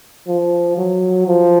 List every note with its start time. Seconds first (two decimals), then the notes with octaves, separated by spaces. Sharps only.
0.27 F3
0.77 F#3
1.28 F3